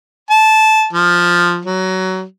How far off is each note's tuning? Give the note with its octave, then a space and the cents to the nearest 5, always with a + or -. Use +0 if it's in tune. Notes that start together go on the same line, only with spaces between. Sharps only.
A5 -15
F3 +5
F#3 +20